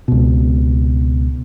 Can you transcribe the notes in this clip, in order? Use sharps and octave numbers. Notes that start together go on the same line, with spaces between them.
C#2 B2